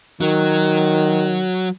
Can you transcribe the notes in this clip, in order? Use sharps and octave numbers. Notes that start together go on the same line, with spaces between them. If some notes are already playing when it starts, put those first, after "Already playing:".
D#3 F#3